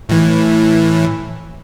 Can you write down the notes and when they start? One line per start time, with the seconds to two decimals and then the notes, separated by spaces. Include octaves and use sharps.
0.09 A2 E3